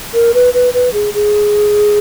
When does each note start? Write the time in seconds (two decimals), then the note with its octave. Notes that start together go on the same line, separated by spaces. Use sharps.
0.14 A#4
0.34 B4
0.54 B4
0.74 B4
0.93 G#4
1.14 G#4